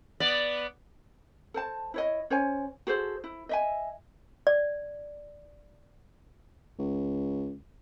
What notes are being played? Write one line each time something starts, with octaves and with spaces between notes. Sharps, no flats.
B3 D5
A4 C5 A5
E4 C#5 D#5
C#4 C5 C#5 G#5
F#4 G#4 A4 C5
E4
D#5 E5 G#5
D5
C#2